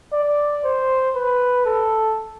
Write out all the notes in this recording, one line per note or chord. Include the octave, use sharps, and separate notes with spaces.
D5
C5
B4
A4